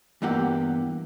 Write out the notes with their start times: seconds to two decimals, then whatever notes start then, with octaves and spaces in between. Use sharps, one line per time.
0.22 E2 G2 E3 A#3 G4 F#5